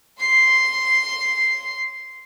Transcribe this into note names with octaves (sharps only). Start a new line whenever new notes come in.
C6 C7